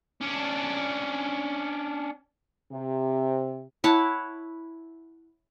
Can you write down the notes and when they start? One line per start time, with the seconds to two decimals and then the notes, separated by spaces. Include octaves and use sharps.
0.21 C#4 D4
2.72 C3
3.84 E4 C#5 F#5 A5